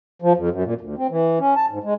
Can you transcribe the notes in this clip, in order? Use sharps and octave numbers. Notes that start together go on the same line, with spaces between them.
F3
F2
F#2
A#2
D2
C4
E3
C#4
A5
G#2
G#3